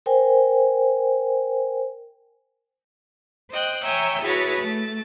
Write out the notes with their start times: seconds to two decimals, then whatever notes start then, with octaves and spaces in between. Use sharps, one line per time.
0.06 A#4 C5 G5 G#5
3.51 C5 D#5 G5 F#6
3.84 C#5 E5 G5 G#5 A#5
4.22 E4 F#4 G#4 B4 C#5 A5
4.61 A3 A5